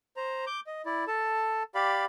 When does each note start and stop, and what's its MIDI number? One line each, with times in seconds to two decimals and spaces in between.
0.17 0.45 72
0.17 0.45 82
0.47 0.60 86
0.47 0.60 91
0.67 0.82 75
0.86 1.05 64
0.86 1.05 74
1.07 1.63 69
1.07 1.63 81
1.75 2.05 67
1.75 2.05 74
1.75 2.05 77
1.75 2.05 83